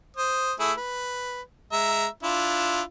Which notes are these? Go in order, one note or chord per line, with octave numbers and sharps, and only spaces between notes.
C5 D#6
A3 E4 G#4
B4
G#3 E5 A#5
D4 E4 F4